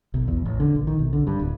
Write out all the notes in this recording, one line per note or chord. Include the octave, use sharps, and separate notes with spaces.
B1
E2
A1
D3
A#1
D#3
B1
D3
G2
D1